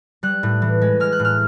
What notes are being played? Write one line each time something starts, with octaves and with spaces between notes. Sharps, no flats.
G3 F#6
A2
E3
G#3
G#3 F6
F#6
A2
F6